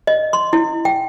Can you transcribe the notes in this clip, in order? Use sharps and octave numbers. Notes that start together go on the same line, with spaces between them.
D#5
C6
E4
G5